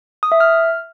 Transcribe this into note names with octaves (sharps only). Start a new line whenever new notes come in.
D#6
E5
F6